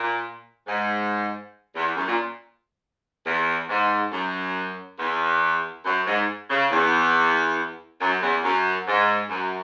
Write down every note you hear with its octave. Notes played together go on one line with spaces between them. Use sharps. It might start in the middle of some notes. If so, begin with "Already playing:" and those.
Already playing: A#2
G#2
E2
F#2
A#2
E2
G#2
F#2
E2
F#2
G#2
C#3
E2
F#2
E2
F#2
G#2
F#2